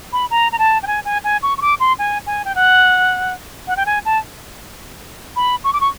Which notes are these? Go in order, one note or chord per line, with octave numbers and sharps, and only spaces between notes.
B5
A#5
A#5
A5
G5
G#5
G#5
G#5
C#6
C#6
D6
C6
G#5
G#5
G5
F#5
F#5
G5
G#5
A5
B5
C#6
D6
C#6